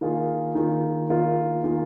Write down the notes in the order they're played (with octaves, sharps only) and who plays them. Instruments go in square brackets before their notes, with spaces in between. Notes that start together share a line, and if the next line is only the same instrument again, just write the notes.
[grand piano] D#3 A#3 F4 G#4
D#3 A#3 F4 G#4
D#3 A#3 F4 G#4
D#3 A#3 F4 G#4